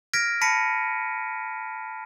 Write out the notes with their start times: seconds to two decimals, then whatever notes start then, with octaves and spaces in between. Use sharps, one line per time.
0.13 F6 G#6 A#6 B6 D7
0.41 A5 B5 A#6 B6 C#7 D#7